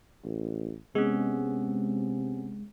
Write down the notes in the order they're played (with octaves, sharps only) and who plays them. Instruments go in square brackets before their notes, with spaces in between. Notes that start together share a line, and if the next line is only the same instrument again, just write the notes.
[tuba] A1
[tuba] C3 [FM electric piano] G#3 [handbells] B3 C#4